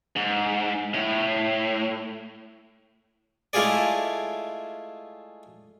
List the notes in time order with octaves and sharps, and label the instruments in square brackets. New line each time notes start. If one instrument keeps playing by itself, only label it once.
[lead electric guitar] G#2
A2
[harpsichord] G#3 A3 E4 F4 G#4 D5